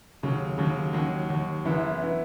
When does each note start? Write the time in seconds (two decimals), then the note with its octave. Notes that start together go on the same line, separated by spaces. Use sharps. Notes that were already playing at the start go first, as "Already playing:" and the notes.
0.23 D#2 C#3 F#3
0.58 D#2 C#3 F#3
0.93 D#2 D#3 F#3
1.29 D#2 D#3 F#3
1.65 F#1 F#2 E3 B3 E4
2.02 E3 B3 E4